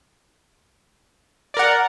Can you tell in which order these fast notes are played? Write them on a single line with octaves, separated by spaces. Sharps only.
D5 A#4 F#5